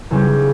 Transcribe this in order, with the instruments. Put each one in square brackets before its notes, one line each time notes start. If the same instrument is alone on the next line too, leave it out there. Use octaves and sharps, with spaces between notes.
[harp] E2 C#3 G3 C#4 G4